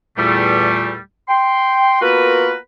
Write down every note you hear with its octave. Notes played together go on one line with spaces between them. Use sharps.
E2 A#2 G3 A3
G5 C6
A#3 B3 F4 F#4 A#4 B4